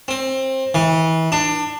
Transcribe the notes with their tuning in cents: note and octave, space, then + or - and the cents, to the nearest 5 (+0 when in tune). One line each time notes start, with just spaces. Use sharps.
C4 +20
E3 -30
D4 +20